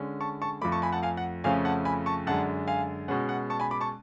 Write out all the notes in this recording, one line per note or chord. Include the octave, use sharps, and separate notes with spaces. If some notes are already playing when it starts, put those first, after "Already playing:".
Already playing: D3 G#3 C#4
A5 C#6
A5 C#6
F2 F3 A3 B5 D6
A5 C#6
G#5 B5
F#5 A5
F5 G#5
F#5
F2 C#3 F3 A3 C#4 F5 G#5
F#5 A5
G#5 B5
A5 C#6
F#2 D3 G#3 F#5 A5
F5 G#5
B2 G#3 C#4 F#5
F#5
A5 C#6
G#5 B5
B5 D6
A5 C#6